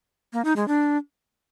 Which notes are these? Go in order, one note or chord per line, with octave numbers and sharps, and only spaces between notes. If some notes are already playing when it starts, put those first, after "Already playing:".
A#3
D#4
G#3
D4